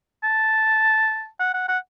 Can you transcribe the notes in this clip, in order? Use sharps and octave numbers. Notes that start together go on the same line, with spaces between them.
A5
F#5
F#5
F#5